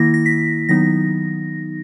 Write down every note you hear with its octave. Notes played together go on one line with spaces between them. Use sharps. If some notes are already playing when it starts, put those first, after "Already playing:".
Already playing: D#3 A#3 E4 A#6
A#6
B6
D#3 F#3 B3 D#4 A#6